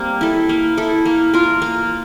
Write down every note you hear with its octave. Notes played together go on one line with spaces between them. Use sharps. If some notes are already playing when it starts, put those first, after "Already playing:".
Already playing: G3 A#3 C4
E4 A4
A#3
E4 A4
A#3
F4 A#4
A#3